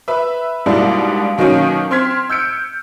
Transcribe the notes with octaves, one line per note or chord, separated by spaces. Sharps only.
B4 E5
G#2 B2 G3 A#3 D4 E4
B2 D#3 F#3 A#3 C#4
C4 C6 F6 G#6 B6
E6 G6 C#7 D7